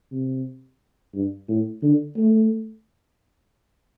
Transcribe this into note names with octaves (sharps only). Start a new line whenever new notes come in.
C3
G2
A2
D3
A3